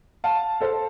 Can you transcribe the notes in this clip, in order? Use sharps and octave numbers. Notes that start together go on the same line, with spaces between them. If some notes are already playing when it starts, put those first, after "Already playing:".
F5 A5
A4 C5